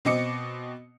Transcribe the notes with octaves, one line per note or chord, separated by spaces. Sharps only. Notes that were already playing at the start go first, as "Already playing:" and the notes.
B2 C4 D#5 D6 C#7